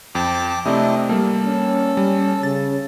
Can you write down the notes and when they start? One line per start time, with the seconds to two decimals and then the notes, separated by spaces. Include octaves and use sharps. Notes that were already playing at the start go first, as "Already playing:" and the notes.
0.15 F2 G5 A5 D6
0.65 C3 A3 C4 D4 E4 D#5
1.09 G3 A#3 A4
1.46 C#4
1.97 G3
2.43 C#3 A6